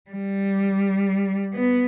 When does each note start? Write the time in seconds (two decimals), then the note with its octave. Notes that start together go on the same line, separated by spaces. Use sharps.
0.11 G3
1.55 B3